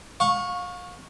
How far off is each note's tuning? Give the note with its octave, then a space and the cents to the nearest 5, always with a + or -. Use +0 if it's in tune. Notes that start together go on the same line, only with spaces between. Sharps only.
F5 +35 C#6 -10